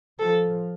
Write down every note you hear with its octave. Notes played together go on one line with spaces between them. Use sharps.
F3 A4